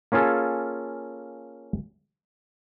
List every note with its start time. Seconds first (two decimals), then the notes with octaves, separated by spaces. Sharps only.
0.12 A#3 C#4 F4 G#4 A4